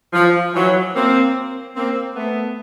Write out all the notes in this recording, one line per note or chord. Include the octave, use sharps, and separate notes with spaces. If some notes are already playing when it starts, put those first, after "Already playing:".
F3
E3 F#3
A#3 C4
A#3 C4
A3 B3